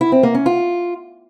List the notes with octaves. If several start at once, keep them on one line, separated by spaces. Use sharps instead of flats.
E4
C4
A#3
C#4
F4